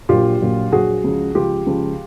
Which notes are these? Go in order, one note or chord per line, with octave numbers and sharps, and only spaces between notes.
A#1 A#2 F#3 F4 G4
A#1 A#2 F#3
A#1 A#2 F#3 F#4 G#4
C#2 C#3 F3
C#2 C#3 F3 F4 G4
C#2 C#3 F3